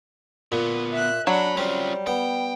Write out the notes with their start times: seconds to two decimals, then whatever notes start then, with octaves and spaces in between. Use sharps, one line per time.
0.52 D2 A#2 B3
0.92 E5 F#6
1.27 F#3 D4 F#5 A5 B5
1.57 G3 C4 C#4 F4
2.07 B3 G5